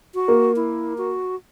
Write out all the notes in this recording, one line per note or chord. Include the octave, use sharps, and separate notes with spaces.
F#4
A#3
E4
F#4